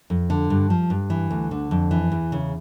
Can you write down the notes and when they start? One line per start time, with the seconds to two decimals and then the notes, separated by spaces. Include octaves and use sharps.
0.10 F2
0.30 D3
0.50 G2
0.70 F3
0.90 G2
1.10 E3
1.31 D2
1.51 D3
1.71 F2
1.91 E3
2.12 E2
2.32 C#3